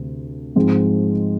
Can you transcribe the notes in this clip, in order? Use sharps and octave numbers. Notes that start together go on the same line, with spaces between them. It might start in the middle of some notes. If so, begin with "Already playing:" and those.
Already playing: D2 C3
G#2 F3 G#3 C4